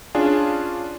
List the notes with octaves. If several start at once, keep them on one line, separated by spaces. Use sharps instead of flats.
C#4 D4 F4 G#4